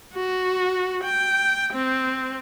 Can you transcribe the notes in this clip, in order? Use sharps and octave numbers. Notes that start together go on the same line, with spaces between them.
F#4
G5
C4